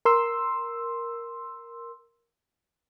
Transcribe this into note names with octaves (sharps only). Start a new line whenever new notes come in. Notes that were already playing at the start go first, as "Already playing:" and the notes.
A#4 C6 E6